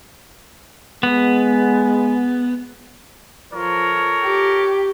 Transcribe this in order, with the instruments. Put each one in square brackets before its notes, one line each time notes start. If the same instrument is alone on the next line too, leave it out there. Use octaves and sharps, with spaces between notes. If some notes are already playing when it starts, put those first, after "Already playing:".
[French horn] G#3 [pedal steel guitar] B3
[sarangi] F3 [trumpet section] A4 A#4 C#5
[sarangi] G4